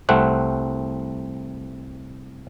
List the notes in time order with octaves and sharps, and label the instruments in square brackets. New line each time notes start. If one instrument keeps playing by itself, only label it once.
[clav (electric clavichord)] C2 A3 C4 F#5